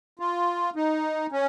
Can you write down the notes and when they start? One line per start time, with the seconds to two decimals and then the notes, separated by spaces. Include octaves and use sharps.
0.20 F4
0.76 D#4
1.32 C#4